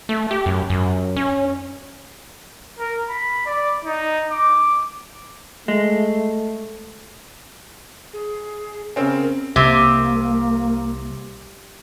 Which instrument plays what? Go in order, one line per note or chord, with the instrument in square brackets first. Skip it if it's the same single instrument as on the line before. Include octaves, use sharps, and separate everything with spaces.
[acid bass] A3
G4
F#2
F#2
C#4
[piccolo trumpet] A#4
B5
D5
D#4
D6
[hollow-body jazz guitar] G#3 [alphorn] A3
[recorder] G#4
[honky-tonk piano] C#3 C4 C#4 [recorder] A#4
[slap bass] C2 [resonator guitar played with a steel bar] C3 [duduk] A#3